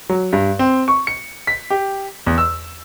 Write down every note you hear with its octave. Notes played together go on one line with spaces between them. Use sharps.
F#3
G2
C4
C#6
C#7
B6
G4
E2
E6